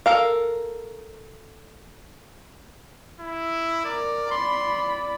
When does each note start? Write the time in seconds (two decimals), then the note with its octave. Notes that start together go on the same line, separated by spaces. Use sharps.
0.06 A4 A#4 F5
3.20 E4
3.85 A#4 D5
4.31 D5 B5 C6